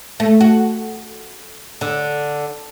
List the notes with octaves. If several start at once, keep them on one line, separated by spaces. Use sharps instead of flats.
A3
F#4
D3